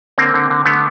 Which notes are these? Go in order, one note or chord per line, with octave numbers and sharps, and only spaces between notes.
D3 A#3 C4
D3
D3
D3 A3 B3